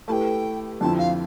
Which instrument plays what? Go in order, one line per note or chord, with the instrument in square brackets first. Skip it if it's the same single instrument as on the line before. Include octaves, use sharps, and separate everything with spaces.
[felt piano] A3 E4 G4 B4 [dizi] G5 A5
[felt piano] F2 D3 F3 C4 E4 [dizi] A5
[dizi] F5